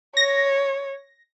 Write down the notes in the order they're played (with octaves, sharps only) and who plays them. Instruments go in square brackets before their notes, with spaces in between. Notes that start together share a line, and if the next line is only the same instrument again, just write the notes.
[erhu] C#5 [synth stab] A#6